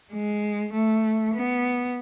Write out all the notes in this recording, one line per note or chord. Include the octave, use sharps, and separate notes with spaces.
G#3
A3
B3